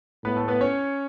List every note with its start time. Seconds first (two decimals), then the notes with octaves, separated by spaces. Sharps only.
0.24 A2 B3 B4
0.36 A3 A4
0.48 B3 B4
0.61 C#4 C#5